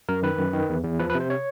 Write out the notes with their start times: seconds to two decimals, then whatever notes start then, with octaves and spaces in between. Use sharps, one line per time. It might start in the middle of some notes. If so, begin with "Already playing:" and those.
0.09 F#2 A#4
0.23 D#3 B4
0.38 F#2
0.53 D#3
0.69 E2
0.84 E2
0.99 F3 B4
1.10 B4
1.15 C3
1.20 C5
1.30 C#5